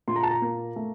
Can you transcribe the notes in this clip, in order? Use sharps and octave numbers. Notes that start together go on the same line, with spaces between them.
A#2 C6
A#5
A5
A#5
A#3
A3